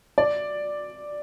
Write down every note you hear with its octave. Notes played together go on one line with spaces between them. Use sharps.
D5